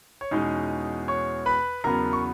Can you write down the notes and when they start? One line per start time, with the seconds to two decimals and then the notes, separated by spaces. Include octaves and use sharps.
0.21 C#5
0.31 E2 B2 G#3 C#4 D#4 D#5
1.08 C#5 C#6
1.46 B4 B5
1.84 E2 C#3 F#3 B3 A#4 A#5
2.13 C#6